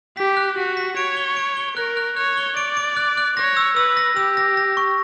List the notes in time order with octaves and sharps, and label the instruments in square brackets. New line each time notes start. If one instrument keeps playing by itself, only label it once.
[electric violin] G4 [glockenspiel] B6
[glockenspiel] F#6
[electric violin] F#4 [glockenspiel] B6
[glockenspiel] B6
[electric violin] C#5 [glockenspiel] D7
[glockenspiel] G7
D7
G7
[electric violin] A#4 [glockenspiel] F#6
[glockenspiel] F#6
[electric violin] C#5 [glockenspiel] F#6
[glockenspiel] G7
[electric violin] D5 [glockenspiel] D7
[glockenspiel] D7
F#6
F#6
[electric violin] C#5 [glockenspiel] A#6
[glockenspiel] E6
[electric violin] B4 [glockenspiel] E6
[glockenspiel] A#6
[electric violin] G4 [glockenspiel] E6
[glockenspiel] A#6
A#6
C#6